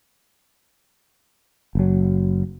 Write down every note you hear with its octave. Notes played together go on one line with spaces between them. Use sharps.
F#1 F#3